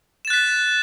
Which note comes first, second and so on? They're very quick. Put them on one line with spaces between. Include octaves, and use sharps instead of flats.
E7 A6 F#6 B6